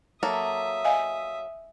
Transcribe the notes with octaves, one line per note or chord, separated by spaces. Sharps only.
F#3 A#3 A4 E5 D#6
D#5 F5 G#5